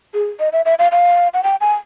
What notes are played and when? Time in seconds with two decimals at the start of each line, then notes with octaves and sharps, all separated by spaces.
0.14 G#4
0.40 D#5
0.53 E5
0.65 E5
0.79 F5
0.92 F5
1.34 F#5
1.43 G5
1.61 G#5